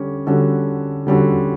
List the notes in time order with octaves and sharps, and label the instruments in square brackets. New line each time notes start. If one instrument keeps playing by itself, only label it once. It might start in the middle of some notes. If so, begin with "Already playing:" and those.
Already playing: [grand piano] D3 G3 C#4 A4
D3 G3 C#4 F#4 A4
D3 G3 C#4 F#4 A4